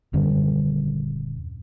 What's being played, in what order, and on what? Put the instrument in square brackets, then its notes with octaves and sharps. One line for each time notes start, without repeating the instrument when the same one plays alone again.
[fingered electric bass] D#1 F#2 D3 G3